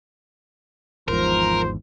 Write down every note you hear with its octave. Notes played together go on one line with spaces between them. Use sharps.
G#1 E2 G#2 F3 A#4 C5